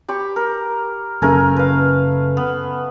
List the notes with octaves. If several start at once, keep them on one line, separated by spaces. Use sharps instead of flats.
G4 B5 C#6
A#4
F#1 C#3 A3 A#4 G#5
B4 F5
B3